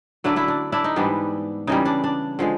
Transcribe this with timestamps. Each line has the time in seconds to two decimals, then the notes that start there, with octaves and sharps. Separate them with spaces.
0.24 D3 F#3 A3 D4 E4
0.36 D4 E4
0.48 D4
0.72 D4 E4
0.84 D#4
0.96 G#2 E3 G3 B3 D4
1.67 C#3 E3 G3 D#4
1.85 D4
2.04 D4
2.39 D3 F3 G#3